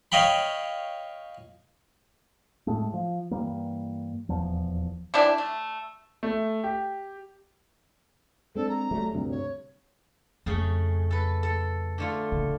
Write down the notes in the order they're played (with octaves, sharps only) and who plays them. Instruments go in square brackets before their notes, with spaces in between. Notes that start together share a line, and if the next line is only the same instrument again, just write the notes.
[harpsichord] C#5 D#5 F5 G5 B5
[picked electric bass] A2 G#3 A3
F3
G2 E3 G3 A#3
D#1 B1 E2 F3
[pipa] C3 E3 D4
A3
[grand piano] A3
G4
[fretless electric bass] G#3 C4 D4 [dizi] A4
[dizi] A#5
[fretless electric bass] F#3 G3 A3
D2 G2 C3
[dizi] C#5
[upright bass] F2 [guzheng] C#3 A3 G#4
[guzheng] A4 B4
A4
D3 A3 F4
[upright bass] D1 C#3